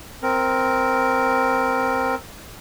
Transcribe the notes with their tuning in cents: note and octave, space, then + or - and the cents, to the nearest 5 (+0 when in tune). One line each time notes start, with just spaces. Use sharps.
C4 +0 A#4 +0